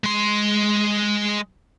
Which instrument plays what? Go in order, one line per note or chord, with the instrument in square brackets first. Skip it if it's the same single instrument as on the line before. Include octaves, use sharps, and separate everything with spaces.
[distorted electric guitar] G#3 C6